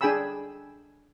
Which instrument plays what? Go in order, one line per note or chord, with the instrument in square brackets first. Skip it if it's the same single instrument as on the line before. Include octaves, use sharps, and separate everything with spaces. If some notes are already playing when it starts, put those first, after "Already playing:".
[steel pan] D4 G#4 G5 G#5 B5 E6